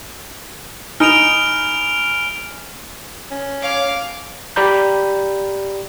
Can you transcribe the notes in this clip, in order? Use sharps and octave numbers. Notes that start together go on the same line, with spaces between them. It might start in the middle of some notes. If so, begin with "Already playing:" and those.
D#4 G#5 B5 F6 D7 D#7 F7
C#4
C#5 F5 D6
G4 D5 A#5 B5 G6